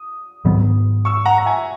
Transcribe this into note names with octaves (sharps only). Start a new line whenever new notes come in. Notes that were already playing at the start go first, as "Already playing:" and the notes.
Already playing: D#6
G#2 D#3 F#3 B3
C#6 E6
F#5 A#5
A#5
E5 G#5